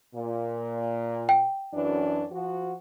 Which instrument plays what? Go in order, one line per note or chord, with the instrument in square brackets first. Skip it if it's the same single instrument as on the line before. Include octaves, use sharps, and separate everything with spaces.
[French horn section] A#2
[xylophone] G5
[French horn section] F#2 E3 D4
F3 F#4